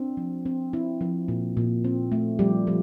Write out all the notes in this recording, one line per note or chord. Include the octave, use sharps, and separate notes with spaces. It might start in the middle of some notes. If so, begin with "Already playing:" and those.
Already playing: C4 D4
F3
C4
C4 E4
F3
A#2
A#2
C4
A3
F3 G3 G4
F3